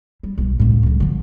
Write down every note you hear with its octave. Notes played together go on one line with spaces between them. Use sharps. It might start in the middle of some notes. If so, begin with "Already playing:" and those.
G3
B1 G#2
C#2 A2
C#2 F#3
D3 F3